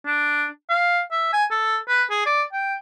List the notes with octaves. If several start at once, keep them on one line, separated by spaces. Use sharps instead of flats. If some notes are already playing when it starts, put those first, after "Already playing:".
D4
F5
E5
G#5
A4
B4
G#4
D5
G5